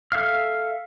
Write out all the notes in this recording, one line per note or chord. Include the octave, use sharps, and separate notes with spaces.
A4 E5 F5 F6